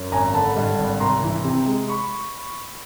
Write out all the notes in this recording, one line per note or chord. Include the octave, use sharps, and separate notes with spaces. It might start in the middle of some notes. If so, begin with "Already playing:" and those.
Already playing: F#2
G#1 G#5 A#5
D3 A5 B5
G2
G#1
C2 A#5 C6
E3
C3
G#3
B5 C#6